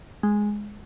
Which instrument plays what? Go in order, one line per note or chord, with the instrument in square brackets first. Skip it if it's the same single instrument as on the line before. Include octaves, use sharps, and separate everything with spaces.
[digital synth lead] G#3